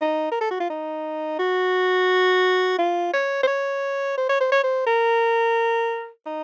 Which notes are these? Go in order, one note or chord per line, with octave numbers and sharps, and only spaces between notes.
D#4
A#4
A4
F#4
F4
D#4
F#4
F4
C#5
C5
C#5
C5
C#5
C5
C#5
C5
A#4
D#4